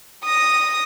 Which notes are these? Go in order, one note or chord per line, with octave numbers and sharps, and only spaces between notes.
D#6 A#6